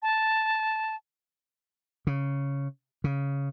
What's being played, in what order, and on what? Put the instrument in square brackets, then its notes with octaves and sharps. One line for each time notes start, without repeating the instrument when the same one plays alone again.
[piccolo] A5
[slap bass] C#3
C#3